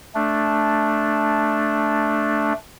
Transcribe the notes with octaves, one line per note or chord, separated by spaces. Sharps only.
A3 D4